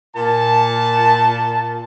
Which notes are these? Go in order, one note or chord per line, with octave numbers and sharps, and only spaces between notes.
A#2 A5